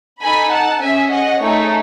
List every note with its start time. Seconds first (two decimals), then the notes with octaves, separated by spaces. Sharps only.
0.21 D#4 A4 G#5 B5
0.51 F#5 A5
0.81 C#4 G#4 E5 G#5
1.11 D#5 F#5
1.41 A3 D#4 G#4 C#5